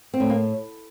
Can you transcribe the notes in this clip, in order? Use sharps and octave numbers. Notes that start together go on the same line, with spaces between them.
C4
A2
A#3